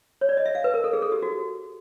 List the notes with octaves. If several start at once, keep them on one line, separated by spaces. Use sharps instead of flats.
C#5
D5
D#5
E5
F5
B4
A#4
A4
G#4
A4
G4
F#4